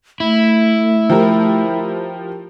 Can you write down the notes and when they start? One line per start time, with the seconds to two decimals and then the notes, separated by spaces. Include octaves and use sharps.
0.20 A3 E4
1.10 F3 G4 A#4